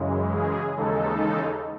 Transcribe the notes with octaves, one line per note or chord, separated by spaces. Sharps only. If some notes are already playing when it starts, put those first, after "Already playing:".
Already playing: F#2 C#3 E3 G#3
G#4
D#2 C#3 E3 G#3 D#4 A4